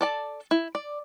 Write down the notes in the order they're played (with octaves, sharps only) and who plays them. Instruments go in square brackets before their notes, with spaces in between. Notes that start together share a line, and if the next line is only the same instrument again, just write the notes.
[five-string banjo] A4 D5 A5
E4
D5